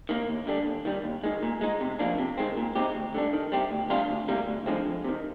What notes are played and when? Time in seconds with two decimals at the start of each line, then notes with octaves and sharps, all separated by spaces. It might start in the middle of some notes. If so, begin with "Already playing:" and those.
0.09 D#3 A#3
0.29 D#2
0.47 D3 G3 D4
0.66 D#2
0.85 D#3 G3
1.04 D#2
1.24 D#3 G#3
1.43 A#2
1.61 G#3 D#4
1.81 C3
1.99 F3 A#3 D4
2.18 C3
2.38 D#3 G#3 C4
2.57 A#2
2.75 G#3 C4 D#4 G4
2.95 D2
3.15 D3 G3 D4
3.33 D#3
3.52 G3 C4 G4
3.71 D2
3.90 C3 G3 D4 F4
4.09 D2
4.28 C3 G3 A#3
4.47 D2
4.66 D3 F3 G#3 C4
4.86 F2
5.05 C3 D#3